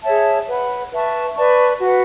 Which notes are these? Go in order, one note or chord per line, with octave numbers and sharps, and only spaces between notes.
G#4 C#5 E5 A5
B4 F#5 B5
B4 E5 A5 C#6
B4 D5 A5 C#6
F#4 B4 F#5